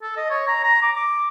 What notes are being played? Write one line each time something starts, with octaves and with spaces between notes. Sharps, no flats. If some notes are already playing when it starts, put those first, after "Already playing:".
A4
D#5
C#5
A#5
A#5
D6
D6